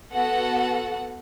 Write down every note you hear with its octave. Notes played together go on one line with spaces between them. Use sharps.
B3 F#4 A4 F#5